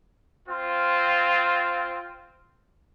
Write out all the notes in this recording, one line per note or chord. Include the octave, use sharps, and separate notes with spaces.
C4 F4